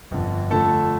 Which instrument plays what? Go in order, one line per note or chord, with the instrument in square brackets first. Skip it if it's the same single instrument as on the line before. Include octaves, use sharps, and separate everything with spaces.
[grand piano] G1 F2 D3
F2 D3 F3 A3 A4